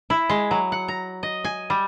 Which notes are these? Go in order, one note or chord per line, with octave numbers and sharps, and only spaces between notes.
E4
G#3
F#3
F#5
A#5
D#5
G#5
G3